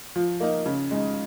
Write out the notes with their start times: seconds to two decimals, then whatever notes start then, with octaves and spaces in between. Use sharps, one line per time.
0.16 F3
0.40 A#3 D#4
0.66 C#3
0.91 G#3 D#4